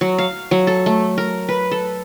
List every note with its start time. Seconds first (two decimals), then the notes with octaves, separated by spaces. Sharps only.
0.01 F#3
0.18 F5
0.51 F#3
0.67 A4
0.86 A3
1.18 A#4
1.49 B4
1.71 A4